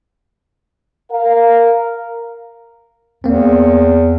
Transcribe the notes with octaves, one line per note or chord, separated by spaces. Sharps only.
A#4 F5
E2 A#3 C4